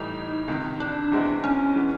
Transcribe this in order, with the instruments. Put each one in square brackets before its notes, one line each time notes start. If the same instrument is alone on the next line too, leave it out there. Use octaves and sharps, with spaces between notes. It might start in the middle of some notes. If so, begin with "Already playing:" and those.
Already playing: [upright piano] A2 E3 G3 [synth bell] D#4
[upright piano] C#2 C3 D#3
[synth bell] D4
[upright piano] E2 B2 G#3 C4 E4
[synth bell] C#4
[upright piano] E3 G#3 B3